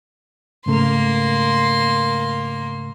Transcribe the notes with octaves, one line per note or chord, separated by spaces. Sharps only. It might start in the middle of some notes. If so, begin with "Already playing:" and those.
G#2 C#3 A3 A#3 C6